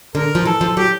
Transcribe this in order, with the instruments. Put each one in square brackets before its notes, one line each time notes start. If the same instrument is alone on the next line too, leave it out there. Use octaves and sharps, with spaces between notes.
[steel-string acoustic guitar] D3 [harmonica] A#4
[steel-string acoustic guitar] F3
[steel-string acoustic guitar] E3 [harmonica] A4
[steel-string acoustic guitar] F3
[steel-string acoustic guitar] F#3 [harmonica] G4